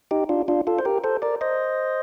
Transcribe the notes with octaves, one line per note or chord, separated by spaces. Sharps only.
D#4 G4
D4 F4
D4 F4
F4 A4
C5
G4 A#4
A4 C5
A#4 D5
C5 D#5